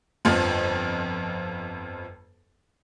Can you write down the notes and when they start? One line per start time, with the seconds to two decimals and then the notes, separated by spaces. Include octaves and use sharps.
0.25 G1 F2 F3